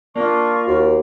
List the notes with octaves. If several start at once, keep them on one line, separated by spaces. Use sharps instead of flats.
A#3 D4 F4 C#6
D#2 F#4